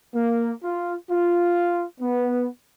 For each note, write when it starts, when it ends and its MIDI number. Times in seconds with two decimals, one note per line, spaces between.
0.15 0.52 58
0.64 0.94 65
1.11 1.84 65
2.01 2.48 59